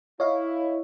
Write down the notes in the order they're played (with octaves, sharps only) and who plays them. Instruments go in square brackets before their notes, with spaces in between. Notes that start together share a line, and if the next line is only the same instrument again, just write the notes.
[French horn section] E4 [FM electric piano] C#5 D#5 F5